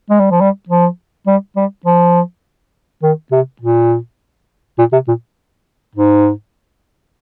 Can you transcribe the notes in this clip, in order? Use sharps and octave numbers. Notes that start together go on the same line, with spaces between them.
G#3
G3
F3
G3
F3
G3
G3
F3
D#3
C3
A#2
A#2
C3
A#2
G#2